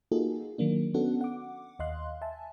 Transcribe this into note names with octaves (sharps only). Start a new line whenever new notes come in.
A#3 D#4 F4 F#4 G#4 A4
D#3 F#3 A#3 D4
B3 C#4 D4 F#4 A4 F#5
F#5 D6
D#2 D#5 F5 C6 F#6
E5 G#5 A5